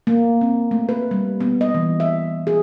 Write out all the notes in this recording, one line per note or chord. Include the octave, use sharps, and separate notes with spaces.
A#3
C4
A3
B4
G3
B3
D#5
E3
E5
G#4